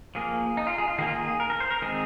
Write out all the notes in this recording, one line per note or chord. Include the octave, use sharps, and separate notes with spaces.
F3 A#3 G#4
D#4
F4
G#4
F4
D#3 A#3 G#4
F4
G#4
A#4
A#4
C5
A#4
D#3 G#3 C4 G#4